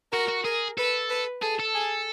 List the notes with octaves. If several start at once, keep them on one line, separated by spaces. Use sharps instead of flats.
F#4 A#4
F#4
G#4 A#4
A4 B4
B4
G#4 A4
A4
G#4